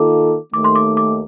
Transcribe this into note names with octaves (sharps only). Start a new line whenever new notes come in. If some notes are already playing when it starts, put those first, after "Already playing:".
Already playing: D#3 A#3 F4 A4 D6
D#2 D#3 A3 D6
C6
D6
D6